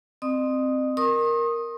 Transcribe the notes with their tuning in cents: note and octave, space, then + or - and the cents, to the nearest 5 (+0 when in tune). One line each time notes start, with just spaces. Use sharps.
C4 -5 D#5 -45 D#6 +0
A#4 +0 C6 +45 D#6 +0